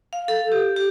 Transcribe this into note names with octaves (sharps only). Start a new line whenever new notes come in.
F5
A4
G4
G4